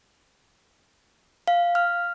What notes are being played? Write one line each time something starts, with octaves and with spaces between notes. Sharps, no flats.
F5
F6